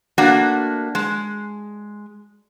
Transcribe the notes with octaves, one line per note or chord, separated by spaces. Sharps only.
A3 A#3 D4 F#4
G#3